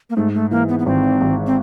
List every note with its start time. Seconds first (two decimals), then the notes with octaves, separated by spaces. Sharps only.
0.10 A#3
0.16 G#2 A3
0.34 A3
0.51 E3 A#3
0.69 B3
0.79 B3
0.86 G#1 C4
1.21 G#1
1.47 C4